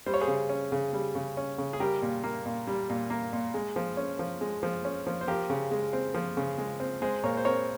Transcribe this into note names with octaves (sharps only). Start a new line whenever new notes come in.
G3 C5
C#5
G#4 C5
C#3
C#4
C#3
G3
C#3
C#4
C#3
G#4
G3 G4 A#4
A#2
A#3
A#2
G3
A#2
A#3
A#2
G#3
F3
C#4
F3
G#3
F3
C#4
F3
C5
F3 G4 A#4
C#3
G#3
C4
F3
C#3
G#3
C4
G#3 G#4 C5
A#2 A#4 C#5
C5
C4 A#4 C#5